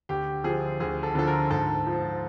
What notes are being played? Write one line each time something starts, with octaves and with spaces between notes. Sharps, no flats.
D2 G4
D3 F3 G#4
D2 G#4
A4
D3 F3 A4
A#4
G#2 A4
F3